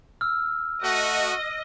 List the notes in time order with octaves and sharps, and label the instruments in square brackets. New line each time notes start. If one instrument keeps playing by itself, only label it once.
[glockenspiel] E6 F6
[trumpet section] A3 F#4 [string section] D#5